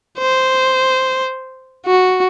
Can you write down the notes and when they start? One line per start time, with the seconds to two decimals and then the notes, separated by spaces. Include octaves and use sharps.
0.19 C5
1.86 F#4